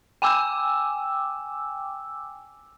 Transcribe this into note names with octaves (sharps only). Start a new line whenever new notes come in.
G5 G#5 D6 E6